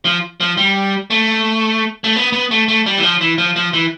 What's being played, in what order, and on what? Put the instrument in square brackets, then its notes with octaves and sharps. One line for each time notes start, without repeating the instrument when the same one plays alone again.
[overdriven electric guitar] F3
F3
G3
A3
A3
B3
B3
A3
A3
G3
E3
F3
E3
F3
F3
E3